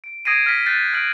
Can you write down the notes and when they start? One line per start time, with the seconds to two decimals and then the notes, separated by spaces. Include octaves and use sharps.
0.04 D7
0.25 D#6 G#6 A#6 C7 D7 D#7
0.46 F6 A#6 B6
0.66 F#6 G6 A6 B6 C7 D#7
0.93 F6 C7 D7 F#7